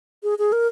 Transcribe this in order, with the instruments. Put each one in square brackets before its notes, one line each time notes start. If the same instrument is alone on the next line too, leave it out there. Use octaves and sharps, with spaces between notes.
[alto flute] G#4
G#4
A#4